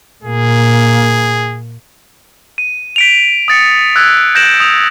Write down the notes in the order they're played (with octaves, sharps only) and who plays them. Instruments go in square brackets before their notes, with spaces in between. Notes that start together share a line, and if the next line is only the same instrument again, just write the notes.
[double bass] A#2 A#3 [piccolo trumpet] G#4
[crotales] D#7
B6 D7 F7
D#6 A6 C#7
E6 F#6 G#6
G6 G#6 A#6 D7 E7 F#7
D#6 F7